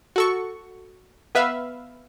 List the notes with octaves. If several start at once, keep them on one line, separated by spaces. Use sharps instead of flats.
F#4 A4 C#6
B3 B4 E5 F5